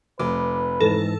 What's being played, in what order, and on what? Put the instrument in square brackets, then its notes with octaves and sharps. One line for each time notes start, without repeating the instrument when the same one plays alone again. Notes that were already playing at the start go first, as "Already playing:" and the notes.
[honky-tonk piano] F1 [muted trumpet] B4 [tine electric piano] D6
[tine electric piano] G#2 E3 A#6 [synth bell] A4